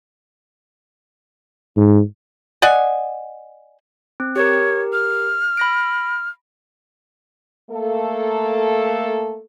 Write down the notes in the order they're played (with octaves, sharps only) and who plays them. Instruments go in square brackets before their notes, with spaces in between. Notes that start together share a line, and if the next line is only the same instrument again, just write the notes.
[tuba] G#2
[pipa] D5 D#5 F#5 G#5
[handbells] C4
[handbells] G4 A#4 [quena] C#5
[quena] F6
[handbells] B5 A#6 D7
[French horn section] A3 A#3 A4